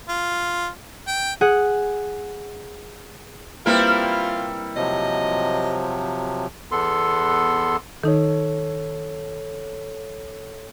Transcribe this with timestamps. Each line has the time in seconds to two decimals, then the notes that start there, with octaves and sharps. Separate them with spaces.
0.09 F4
1.07 G5
1.41 G#4 F#5
3.66 G3 A#3 C4 E4 F4 A#4 B4
4.76 C3 F3 F#3 D#5
6.71 E2 B3 A4 C6
8.03 D#3 D#4 A4 C#5